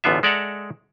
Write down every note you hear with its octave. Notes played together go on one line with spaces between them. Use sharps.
A1 E2 D3 B3 F4 E5
G#3 A4 D5 E5 F#5 A#5